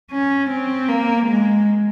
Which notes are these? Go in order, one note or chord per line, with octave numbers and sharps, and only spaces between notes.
C#4
C4
A#3
G#3